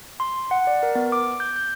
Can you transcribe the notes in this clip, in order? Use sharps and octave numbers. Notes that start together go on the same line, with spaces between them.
C6
F#5
D5
A#4
B3
D6
G6
G6